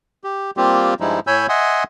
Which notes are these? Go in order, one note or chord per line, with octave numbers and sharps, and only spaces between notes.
G4
G3 A#3 C4 F4 G4
G2 F3 G3 G#3 D#4 E4
A2 C#5 G#5 B5 E6 G6
D#5 E5 F#5 G#5 C6 D#6